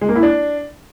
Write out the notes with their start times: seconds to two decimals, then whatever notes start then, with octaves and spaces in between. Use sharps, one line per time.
0.01 G#3
0.09 A#3
0.16 E4
0.23 D4